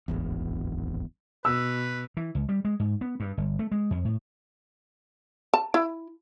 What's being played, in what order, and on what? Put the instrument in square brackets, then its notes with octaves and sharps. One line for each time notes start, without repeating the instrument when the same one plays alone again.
[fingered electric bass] D1 G#1 E2
[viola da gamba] B2 [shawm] B4 [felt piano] E6
[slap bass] E3
C#2
G3
G#3
G#2
B3
G2
G1
A3
G#3
F2
A2
[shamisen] A5
E4